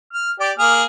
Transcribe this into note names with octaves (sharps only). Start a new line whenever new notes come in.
F6
G4 D5
A#3 G#4 F6